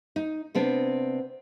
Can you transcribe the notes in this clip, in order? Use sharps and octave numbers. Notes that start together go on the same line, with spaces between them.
D#4
C3 B3 C4 D4